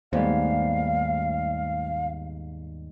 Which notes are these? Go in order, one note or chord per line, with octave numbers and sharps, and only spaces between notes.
D#2 G#2 G3 A3 B3 C5 F5